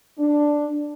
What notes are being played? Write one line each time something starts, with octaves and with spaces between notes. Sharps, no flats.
D4